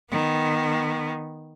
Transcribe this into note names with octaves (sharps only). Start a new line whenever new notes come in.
D#3 B3